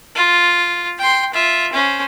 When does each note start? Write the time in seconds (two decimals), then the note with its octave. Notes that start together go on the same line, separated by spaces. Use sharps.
0.15 F4
0.98 G5 C6
1.33 F4 E5
1.72 C#4 C5